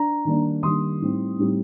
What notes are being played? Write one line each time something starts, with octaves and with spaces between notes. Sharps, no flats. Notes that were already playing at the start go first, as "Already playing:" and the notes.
Already playing: D4 A#5
D#3 G3 A#3 D4
D#3 G3 A#3 D4 C6 D#6
A2 G3 C4 D#4
A2 G3 C4 D#4